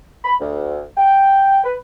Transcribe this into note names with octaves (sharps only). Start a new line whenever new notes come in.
B5
D2
G5
B4